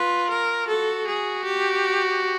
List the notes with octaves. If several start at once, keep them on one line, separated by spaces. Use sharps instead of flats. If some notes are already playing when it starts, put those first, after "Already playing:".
Already playing: F4 B4
A#4
F#4 A4
G#4
G4